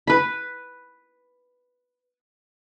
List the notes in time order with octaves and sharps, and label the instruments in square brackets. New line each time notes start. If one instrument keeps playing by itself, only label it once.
[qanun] B4 B5